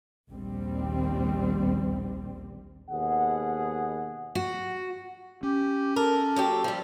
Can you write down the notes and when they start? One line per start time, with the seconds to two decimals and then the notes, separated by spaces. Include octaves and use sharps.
0.31 A#1 D#2 G3 C4
2.89 D#2 B2 G#4 F#5
4.35 F#4
5.43 C#4 G4
5.96 A4 A#4
6.36 F#3 A#3 G4
6.64 F3 G3